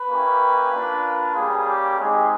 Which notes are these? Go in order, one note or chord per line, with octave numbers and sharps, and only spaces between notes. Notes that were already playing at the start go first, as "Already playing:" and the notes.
Already playing: B4
A#3 C#4 E4 G4
A#3 D4 F4
G3 A#3 C#4 G#4
G4
G#3 C4 D#4 G4 G#4